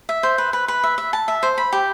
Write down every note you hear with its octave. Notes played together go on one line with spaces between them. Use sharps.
E5
C5
B4
B4
B4
E5
E5
A5
E5
C5
B5
G4